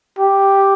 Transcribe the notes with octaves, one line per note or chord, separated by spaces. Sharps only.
G4